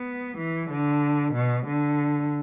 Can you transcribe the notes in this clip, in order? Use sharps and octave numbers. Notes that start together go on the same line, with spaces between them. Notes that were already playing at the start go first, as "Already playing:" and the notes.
Already playing: B3
E3
D3
B2
D3